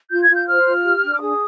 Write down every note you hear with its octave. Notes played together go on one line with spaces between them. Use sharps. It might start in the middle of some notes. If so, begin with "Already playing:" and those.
F4 G6
G#6
F4
G6
C5 F6
F4
G4
D4
D6
G#4 D#6